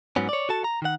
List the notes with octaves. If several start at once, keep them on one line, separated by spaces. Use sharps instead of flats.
G#2 F#3 B3 C#4
C#5 D5
F#4 A4 A5
A#5
D#3 F#5